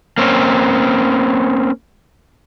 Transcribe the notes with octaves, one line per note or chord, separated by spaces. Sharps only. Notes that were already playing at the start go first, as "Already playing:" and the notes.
A#3 C4 C#4